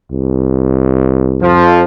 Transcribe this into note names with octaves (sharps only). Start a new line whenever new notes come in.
C2
F2 F3